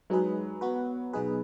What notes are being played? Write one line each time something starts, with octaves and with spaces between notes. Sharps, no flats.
F#3 G#3 D#4 G#4 B4
B3 F#4 B4
B2 F#3 D#4 G#4 B4